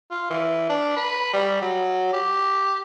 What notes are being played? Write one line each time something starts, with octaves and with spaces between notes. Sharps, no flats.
F4
E3
D4
B4
G3
F#3
G4